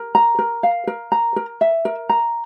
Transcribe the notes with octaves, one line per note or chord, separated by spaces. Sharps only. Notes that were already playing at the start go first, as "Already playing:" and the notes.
Already playing: A#4
A#5
A#4
F5
A#4
A#5
A#4
E5
A#4
A#5